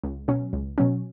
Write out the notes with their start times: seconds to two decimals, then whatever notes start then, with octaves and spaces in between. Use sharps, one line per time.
0.04 C#2
0.28 B2 F#3 C#4
0.53 C#2
0.78 B2 F#3 C#4